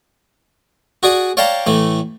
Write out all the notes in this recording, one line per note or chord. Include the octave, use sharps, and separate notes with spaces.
F#4 G#4 D5 D#6
C#5 D5 F5 G5 A5 A#5
A2 E3 A3